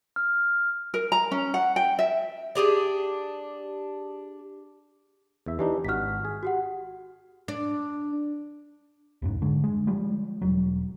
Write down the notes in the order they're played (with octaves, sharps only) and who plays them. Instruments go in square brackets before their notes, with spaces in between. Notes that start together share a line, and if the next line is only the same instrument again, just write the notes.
[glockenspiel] F6
[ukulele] A#4
A#5
C#4
F#5
G5
E5
[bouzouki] D4 G4 G#4 D5
[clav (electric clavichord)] E2 E5
[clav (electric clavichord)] E3 D4 D#4 [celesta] G4
[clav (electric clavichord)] G#1 F#4 [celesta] F6 B6
[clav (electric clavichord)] G#4
[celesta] F#4 G4 F#5
[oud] D4
[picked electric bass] C2 F2 G#2
D3 G#3
G#3
F3 G3 G#3
E1 F#3